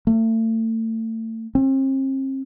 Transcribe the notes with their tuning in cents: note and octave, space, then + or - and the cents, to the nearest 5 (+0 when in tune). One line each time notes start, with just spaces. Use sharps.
A3 +35
C4 +40